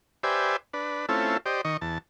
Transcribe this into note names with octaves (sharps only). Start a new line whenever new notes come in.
G4 B4 C5 D5 E5 G#5
D4 B4
A3 C4 C#4 E4 F4 A4
G4 C5 D5 D#5
D#3 D#5 C#6
E2 A5